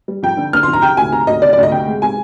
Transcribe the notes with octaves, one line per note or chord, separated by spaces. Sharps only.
G3
F2 G5
D3
D3 F6
C6
F2
A#5
C3 G5
D2 G#5
C3 A#5
D2 D#5
C3 D5
D5
D2 D#5
C3 G5
G#3
C3 G#5